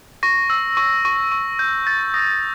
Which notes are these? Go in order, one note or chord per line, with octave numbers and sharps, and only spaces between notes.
C#6 A#6
E6
C#6
C#6
C#6
G6
G6 A6
D#6 A#6